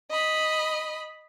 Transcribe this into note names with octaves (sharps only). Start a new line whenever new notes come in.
D#5 B5